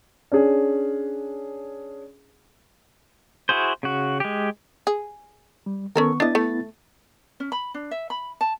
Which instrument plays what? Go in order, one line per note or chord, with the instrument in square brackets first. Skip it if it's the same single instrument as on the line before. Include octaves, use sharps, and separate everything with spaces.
[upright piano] C#4 D4 G#4
[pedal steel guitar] E4 F#4 G#4 C5
C#3 F#4
G#3 G4
[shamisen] G#4
[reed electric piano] G3
[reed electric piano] D#3 B3 C#6 [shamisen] C#4 A4 A#4
[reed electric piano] B3 E4 A6 [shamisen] D4 D#5
[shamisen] A3
[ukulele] C#4
B5
D4
E5
B5
A5